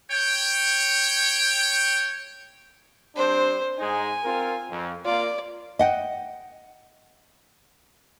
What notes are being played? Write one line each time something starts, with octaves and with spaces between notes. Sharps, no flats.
C#5 G5
G3 C4 D4 C5
G#2 G#3 D#4 G#5
C4 F4 A#4
F2
A#3 F4 D5
D#5 F#5 G5